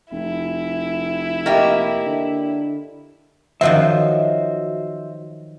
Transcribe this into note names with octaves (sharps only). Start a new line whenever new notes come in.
F1 E4
A#3 G4 D#5 E5 G5
D3
D#3 F3 F#3 F#4 C5 E5